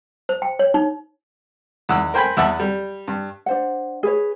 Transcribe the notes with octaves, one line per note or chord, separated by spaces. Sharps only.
C5
G5
C#5
D#4
E2 D#3 F#5 E6
A#4 C5 G5 G#5 B5
E2 B3 E5 F#5 A5
G3
G2
D4 C5 F#5
G#4 B4 C#5